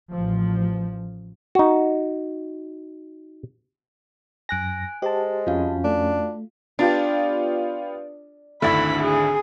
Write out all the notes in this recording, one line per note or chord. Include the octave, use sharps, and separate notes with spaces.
A1 F3
D#4 F#4
F#2 G#5 F#6 A#6 D7
G#3 G4 C5 A5
F2 C#4 F4 F#4 F5
A3 D4
B3 D4 F4 G4
G#1 D2 D3 A3 E4 B5
G#4